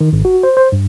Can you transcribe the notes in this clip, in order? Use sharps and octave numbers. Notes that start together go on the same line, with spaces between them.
D#3
G#1
F#4
C5
C5
G2